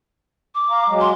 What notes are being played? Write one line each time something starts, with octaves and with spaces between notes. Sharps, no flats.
D6
F5 A#5
F#3 G#3
C6